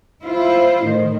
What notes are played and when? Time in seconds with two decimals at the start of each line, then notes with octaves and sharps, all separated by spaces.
0.23 E4 F4 C5
0.85 A2 D#3